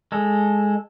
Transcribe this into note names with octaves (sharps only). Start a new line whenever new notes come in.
G#3 A4